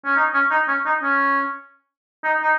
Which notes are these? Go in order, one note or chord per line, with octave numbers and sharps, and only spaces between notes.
C#4
D#4
C#4
D#4
C#4
D#4
C#4
D#4
D#4